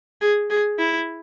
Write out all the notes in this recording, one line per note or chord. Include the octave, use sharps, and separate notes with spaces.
G#4
G#4
E4